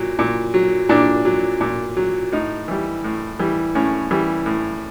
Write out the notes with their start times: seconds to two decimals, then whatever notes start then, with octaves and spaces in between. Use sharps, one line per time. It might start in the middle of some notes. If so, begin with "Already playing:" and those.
Already playing: A#2 F#3
0.19 A#2
0.54 F#3
0.89 A#2 D4
1.25 F#3
1.61 A#2
1.97 F#3
2.32 A2 D#4
2.68 E3 G3
3.04 A2
3.40 E3 G3
3.75 A2 C#4
4.11 E3 G3
4.46 A2